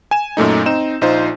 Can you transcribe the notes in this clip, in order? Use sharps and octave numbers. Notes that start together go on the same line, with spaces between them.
G#5 E7
F#2 A#2 A3 D#4
C4 D#4 E7
A#1 D#4 F4 C5